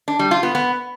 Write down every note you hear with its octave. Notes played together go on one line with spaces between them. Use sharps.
D4
G3
F4
B3
B3